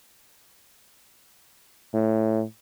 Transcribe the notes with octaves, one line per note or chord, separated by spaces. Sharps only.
A2